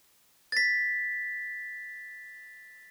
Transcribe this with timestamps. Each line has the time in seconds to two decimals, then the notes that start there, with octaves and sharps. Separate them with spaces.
0.52 A6 B6